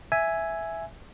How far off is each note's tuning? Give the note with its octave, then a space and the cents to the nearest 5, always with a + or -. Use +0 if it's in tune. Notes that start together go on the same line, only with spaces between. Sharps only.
E5 +0 G#5 +0